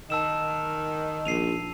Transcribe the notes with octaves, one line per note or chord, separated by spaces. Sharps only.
D#3 A5 E6 E7
A#1 C7 D#7 F7